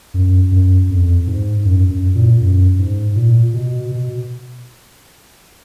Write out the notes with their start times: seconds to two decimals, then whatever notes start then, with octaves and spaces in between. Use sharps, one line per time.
0.14 F#2
0.52 F#2
0.90 F2
1.27 G#2
1.65 F#2
1.90 F#2
2.15 A#2
2.41 F#2
2.79 G#2
3.16 A#2
3.54 B2
3.91 B2